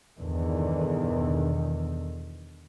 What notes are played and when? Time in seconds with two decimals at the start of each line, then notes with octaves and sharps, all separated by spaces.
0.17 E2 G2 B2 D3 D#3